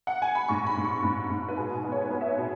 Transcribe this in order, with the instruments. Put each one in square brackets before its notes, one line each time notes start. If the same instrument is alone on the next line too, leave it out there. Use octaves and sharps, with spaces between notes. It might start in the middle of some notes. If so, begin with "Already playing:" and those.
[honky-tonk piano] F#5
G#5
B5
G#2 C#6
B5
G#2
C#6
G#2 B5
G#2
B4
B2 G#4
B3
C#5
B4
B3 G#4
E5
C#5
B2